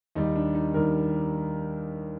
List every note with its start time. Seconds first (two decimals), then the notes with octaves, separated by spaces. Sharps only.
0.15 D#2 D#3 G3 D#4
0.36 D4
0.55 D#4
0.74 D#2 D#3 G3 A#4